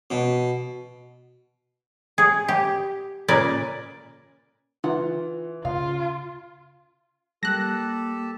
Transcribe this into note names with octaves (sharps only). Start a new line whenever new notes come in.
B2
G#4
G4
A#2 C#3 A#4 B4 D5 G#5
E3 F4 F#5
C#3 F4 F5
G3 A#3 G4 A4 A5 F#6 A#6